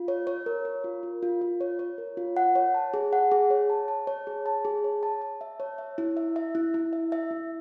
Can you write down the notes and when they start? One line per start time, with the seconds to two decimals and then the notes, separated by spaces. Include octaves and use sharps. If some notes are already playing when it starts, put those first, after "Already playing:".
Already playing: F4
0.08 C#5
0.27 C#5
0.46 A#4
0.65 A#4
0.84 F4
1.03 F4
1.23 F4
1.41 F4
1.61 C#5
1.79 C#5
1.98 A#4
2.17 F4
2.37 F#5
2.55 C#5
2.74 A5
2.94 G#4
3.13 F#5
3.32 G#4
3.50 C#5
3.70 A5
3.88 A5
4.07 C#5
4.27 G#4
4.46 A5
4.65 G#4
4.84 C#5
5.03 A5
5.21 A5
5.41 E5
5.60 C#5
5.78 E5
5.98 E4
6.17 E5
6.36 E5
6.55 E4
6.74 E4
6.93 E5
7.12 E5
7.31 E4